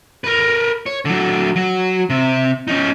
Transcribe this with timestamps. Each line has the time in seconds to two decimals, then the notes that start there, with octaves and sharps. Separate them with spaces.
0.24 A#4 B4
0.86 C#5
1.05 D3 F#3
1.56 F#3
2.10 C3
2.68 C#4 D#4